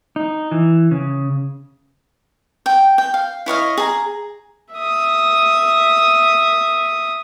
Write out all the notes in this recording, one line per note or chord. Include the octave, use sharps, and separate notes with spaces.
D#4
E3
C#3
G5
G5
F5
E4 C#5 D#5 F5
G#4 A#5
E5 D#6